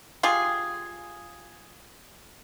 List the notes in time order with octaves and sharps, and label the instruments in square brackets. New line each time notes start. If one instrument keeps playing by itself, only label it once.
[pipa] F4 G4 G#4